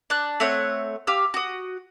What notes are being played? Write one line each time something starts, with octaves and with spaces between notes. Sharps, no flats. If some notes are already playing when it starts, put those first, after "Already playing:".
D4 F#6
A3 C4 C#5 F#5
G4 F5 E6
F#4 D#6